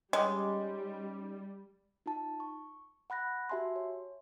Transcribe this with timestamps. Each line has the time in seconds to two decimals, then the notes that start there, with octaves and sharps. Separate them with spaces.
0.13 G3 G#3 C#4 D#4 G4
2.06 D#4 F4 A5
2.40 C#6
3.10 F#5 B5 F#6 A#6
3.50 F#4 G4 E5 G#5 A5 C6
3.76 C#5